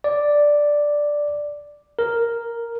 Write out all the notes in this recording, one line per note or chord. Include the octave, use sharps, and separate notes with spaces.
D5
A#4